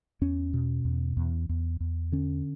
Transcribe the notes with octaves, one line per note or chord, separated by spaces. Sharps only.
E2 C#4
B2
E2
E2
E2
E2
D3 C#4